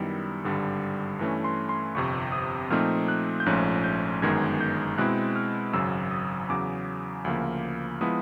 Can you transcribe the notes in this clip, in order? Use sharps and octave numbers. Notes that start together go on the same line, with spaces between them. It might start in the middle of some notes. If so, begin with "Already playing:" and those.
Already playing: F#2 D#3 G3 B3 E4
G#1 G2 D3 G3
G2 E3 A3 C#4
C6
C6
G1 F2 C3 C#6
D#6
A#2 F3 A3 C4 D#4 F6
F#6
G6
A#1 G#2 F3 A3 C#4 F#6
G6
G1 F#2 D#3 G#3 B3 G#6
G6
B2 G#3 C4 E4 F#6
F6
G#1 F#2 C#3 F#3 E6
D#6
E2 C#3 F#3 D6
D2 C#3 F3 A#3
F3 G#3 B3 E4 D#6